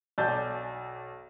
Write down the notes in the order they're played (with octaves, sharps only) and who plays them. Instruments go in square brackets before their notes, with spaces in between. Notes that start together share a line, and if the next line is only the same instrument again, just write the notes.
[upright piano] B1 D5 G#5 A5 G6